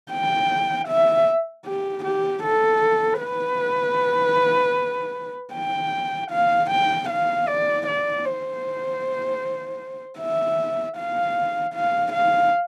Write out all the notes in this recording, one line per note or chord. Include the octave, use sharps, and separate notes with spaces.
G5
E5
G4
G4
A4
B4
G5
F5
G5
F5
D5
D5
C5
E5
F5
F5
F5